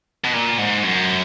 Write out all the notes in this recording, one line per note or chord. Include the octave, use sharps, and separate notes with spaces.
B2
A#2
G#2
F#2